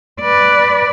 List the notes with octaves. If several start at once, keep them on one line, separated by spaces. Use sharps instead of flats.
B4 D5